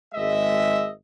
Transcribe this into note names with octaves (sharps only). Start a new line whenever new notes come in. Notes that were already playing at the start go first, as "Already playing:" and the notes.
G#1 G#3 D#5 E5